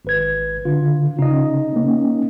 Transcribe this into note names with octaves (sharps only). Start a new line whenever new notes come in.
G#1 B4 G#6
D3 F4
C#3 D#4 D#5
A#3 C#4